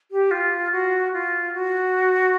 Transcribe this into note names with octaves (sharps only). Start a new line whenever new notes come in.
G4
F4
F#4
F4
F#4